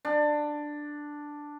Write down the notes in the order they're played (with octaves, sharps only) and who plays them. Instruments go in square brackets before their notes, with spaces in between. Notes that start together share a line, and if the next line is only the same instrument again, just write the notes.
[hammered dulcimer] D4